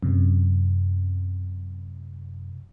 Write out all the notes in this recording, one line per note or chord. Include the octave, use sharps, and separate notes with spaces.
F#2 C3